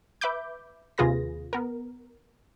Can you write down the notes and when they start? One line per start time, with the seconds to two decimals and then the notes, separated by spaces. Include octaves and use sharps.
0.21 B4 E5 B5 D6 G6
0.98 D#2 C3 F4 G#4 B4 A#6
1.53 B3 A#4